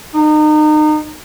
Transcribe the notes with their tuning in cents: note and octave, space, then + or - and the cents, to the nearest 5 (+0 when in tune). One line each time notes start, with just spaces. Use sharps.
D#4 -30